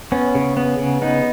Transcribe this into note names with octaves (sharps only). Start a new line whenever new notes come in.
B3 C#4
C#3
B3
C#3
B3 D#4